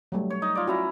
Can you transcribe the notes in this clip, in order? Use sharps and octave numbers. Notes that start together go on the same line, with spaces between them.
F#3 G3 A3
C#5
D#4
F4 D5
C#4 E4 F#4 A#5